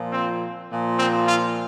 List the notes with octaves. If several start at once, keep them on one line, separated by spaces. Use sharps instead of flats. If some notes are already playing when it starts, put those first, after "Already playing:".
Already playing: A#2 F3
C4
A#2 F3
C4
F4